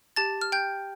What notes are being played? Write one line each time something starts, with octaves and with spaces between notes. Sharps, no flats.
G4 A5 A6
F6
G5 G6